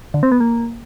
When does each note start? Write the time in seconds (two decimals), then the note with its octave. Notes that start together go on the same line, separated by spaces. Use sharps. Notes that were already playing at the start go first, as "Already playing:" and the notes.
0.14 D3
0.23 C4
0.32 B3
0.40 A#3